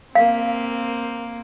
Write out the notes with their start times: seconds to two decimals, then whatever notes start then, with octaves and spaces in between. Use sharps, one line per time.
0.15 A#3 C4 F5